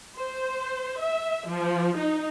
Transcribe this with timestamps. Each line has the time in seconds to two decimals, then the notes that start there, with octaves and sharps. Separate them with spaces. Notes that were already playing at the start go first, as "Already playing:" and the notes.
0.17 C5
1.00 E5
1.49 F3
1.98 D#4